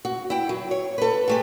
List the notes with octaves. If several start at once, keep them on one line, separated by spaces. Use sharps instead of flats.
F#4
E4 G5
F#3
C#5
A4 B4
G#3 A3 G4